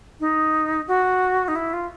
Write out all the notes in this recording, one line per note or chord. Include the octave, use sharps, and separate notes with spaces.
D#4
F#4
D#4
E4
F4